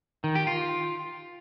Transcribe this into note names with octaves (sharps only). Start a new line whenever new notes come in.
D#3
G4
F4